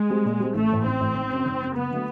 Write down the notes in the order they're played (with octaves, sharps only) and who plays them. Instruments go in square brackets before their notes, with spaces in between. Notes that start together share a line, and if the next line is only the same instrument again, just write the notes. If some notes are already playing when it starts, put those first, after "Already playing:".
Already playing: [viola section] G#3
[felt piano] G3 C4
A#2
G3 C4
[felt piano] A1 [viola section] A3
[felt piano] A2 E3
[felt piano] A1 [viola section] C4
[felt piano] A2 E3
G#1
F#2 C#3
G#1
F#2 C#3
[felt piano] F#1 [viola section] B3
[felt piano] D3 F#3 A3